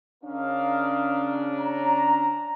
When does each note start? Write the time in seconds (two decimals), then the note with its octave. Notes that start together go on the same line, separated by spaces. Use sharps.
0.24 C#3 C#4 D4 A#4 D#5 F5
1.60 A#5